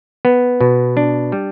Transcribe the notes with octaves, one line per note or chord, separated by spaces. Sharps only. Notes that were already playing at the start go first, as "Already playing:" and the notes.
B3
B2
D4
G3